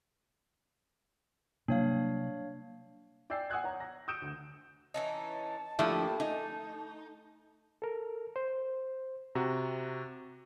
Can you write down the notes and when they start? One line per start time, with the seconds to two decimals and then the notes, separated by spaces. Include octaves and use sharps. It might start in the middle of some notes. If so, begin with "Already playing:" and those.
1.68 C3 F#3 G3 A#3 D4 C#5 F5
3.30 D5 G5 G#5 E6 G6 C7
3.50 F#5 G#5 D#6 E6 F#6 G#6
3.64 C#5 F#5 A#5
3.80 A#6
4.08 D#6 E6 G6 C#7 D7 E7
4.22 D2
4.94 E3 C#4 D#4 A5
5.79 F3 G3 A3 A#3 D4 E4
6.20 D#4 G#5
7.82 A4 A#4
8.36 C5
9.35 C3 F#4 A#5